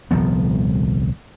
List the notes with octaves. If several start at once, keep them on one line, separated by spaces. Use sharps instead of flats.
D#1 C2 F3 B3